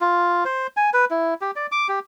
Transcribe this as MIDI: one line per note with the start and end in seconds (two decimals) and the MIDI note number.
0.01 0.44 65
0.45 0.67 72
0.77 0.90 80
0.94 1.05 71
1.11 1.34 64
1.41 1.51 67
1.56 1.67 74
1.72 1.87 86
1.89 1.99 67